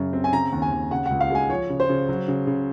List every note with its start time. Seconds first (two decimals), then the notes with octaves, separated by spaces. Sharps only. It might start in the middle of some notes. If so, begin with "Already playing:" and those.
Already playing: F#2 C#3
0.13 C4
0.24 G#5
0.32 C#3 A#5
0.52 D#2
0.62 G#5
0.72 D#2
0.91 C#3 F#5
1.06 C#2 F#5
1.21 F5
1.30 G#3 G#5
1.50 F3 C#5
1.70 C#3
1.80 C5
1.89 C#3
2.09 F#3
2.28 C#3
2.47 C#3